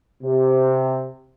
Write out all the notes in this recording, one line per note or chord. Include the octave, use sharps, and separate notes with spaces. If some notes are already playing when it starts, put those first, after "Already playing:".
C3